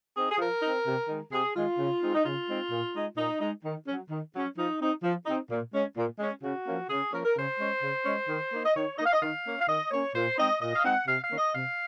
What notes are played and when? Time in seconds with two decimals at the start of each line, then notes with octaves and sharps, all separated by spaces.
0.16 C4 D#4 G#4
0.31 G#4
0.38 F3 A#4
0.63 C4 D#4
0.86 C3
1.08 D#3 G#3
1.32 C3 G#4
1.55 D#3 G#3 F4
1.78 C#3
2.02 G#3 C4 D#4
2.14 D#4
2.24 C#3 F4
2.48 G#3 C4 D#4
2.71 A#2
2.95 G#3 D#4
3.17 A#2 D#4
3.41 G#3 D#4
3.64 D#3
3.87 F#3 C#4
4.10 D#3
4.34 F#3 C#4
4.57 F3 D#4
4.80 C4 D#4
5.03 F3
5.26 C4 D#4
5.50 A#2
5.74 G#3 C#4
5.97 A#2
6.19 G#3 C#4
6.43 C#3 F#4
6.66 F3 A#3 C#4
6.89 C#3 G#4
7.12 F3 A#3 C#4 A#4
7.25 A#4
7.36 C#3 C5
7.59 G#3 C#4
7.82 C#3
8.05 G#3 C#4
8.28 D#3
8.52 A#3 D#4
8.65 D#5
8.75 D#3 C#5
8.98 A#3 D#4 D#5
9.06 F5
9.13 D#5
9.21 D#3 F5
9.45 A#3 C#4
9.60 F5
9.68 D#3 D#5
9.91 A#3 C#4 C#5
10.14 A#2 C5
10.38 G#3 C4 D#4 D#5
10.61 A#2 D#5
10.74 F5
10.84 G#3 C4 D#4 F#5
11.07 C3 F5
11.23 F5
11.30 D#3 A#3 C#4
11.38 D#5
11.53 C3 F5